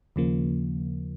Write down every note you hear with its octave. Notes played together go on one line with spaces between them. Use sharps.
D#2 C#3 F3 A#3